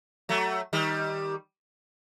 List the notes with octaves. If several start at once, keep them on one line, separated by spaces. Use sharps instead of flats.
F#3 A3
D#3 G3